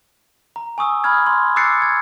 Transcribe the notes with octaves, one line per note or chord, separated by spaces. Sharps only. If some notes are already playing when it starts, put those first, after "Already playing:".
A#5
G#5 C#6 D#6 E6
B5 D#6 F6 G#6
C6
D6 E6 F#6 A6 C7 C#7
G#6